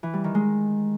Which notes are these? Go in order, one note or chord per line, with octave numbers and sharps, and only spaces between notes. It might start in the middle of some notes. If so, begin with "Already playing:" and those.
E3
G3
D#3
G#3